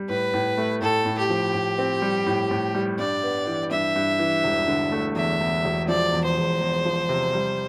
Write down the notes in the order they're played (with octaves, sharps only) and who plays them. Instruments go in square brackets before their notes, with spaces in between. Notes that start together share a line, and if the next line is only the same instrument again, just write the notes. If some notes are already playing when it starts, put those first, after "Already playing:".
Already playing: [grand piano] G3
[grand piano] A2 [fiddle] B4
[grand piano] A2
A3
[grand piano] A2 [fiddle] A4
[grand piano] A2
[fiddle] G4
[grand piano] F3
A2
C4
G3
A2
A2
G3
[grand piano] G2 [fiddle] D5
[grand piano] B3
E3
[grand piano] G2 [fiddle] E5
[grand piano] G2
E3
E1
D3
A3
[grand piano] E2 [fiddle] E5
[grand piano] E2
E1
[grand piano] F3 [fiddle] D5
[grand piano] E2
[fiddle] C5
[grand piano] E1
E2
F3
C3
G3